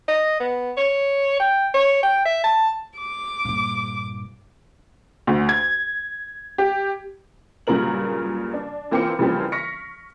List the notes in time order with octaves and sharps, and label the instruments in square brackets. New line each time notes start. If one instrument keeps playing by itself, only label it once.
[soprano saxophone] D#5
B3
C#5
G5
C#5
G5
E5
A5
[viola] D6
[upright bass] G2 A#2
[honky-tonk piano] D2
G#6
G4
G2 A#2 C#3 F#3 A#4 F#7
D4
E3 A#3 C4 F4 D6 C#7
C#3 E3 F3 G3 A#3 C4
C#6 F6 A#6 B6 C#7